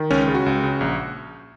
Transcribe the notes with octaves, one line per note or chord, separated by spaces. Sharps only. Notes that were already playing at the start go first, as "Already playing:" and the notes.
Already playing: D#3
C#2 C#4
C#3
F#4
C#2
C#3
A#1